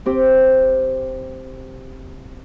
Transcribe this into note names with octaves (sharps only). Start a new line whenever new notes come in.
C4 G4